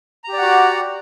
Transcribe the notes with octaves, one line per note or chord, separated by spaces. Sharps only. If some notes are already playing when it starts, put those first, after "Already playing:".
F#4 G4 D5 F#5 A#5